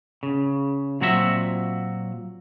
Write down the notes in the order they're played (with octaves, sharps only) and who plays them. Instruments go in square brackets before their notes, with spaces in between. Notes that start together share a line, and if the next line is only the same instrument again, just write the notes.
[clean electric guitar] C#3
A#2 F#3 C4 F#4 A#4 E5